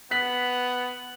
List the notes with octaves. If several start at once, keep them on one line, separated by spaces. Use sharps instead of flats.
B3 F#6 B6 F#7